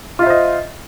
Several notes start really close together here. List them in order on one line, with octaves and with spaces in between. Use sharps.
F4 E5 C5 D#5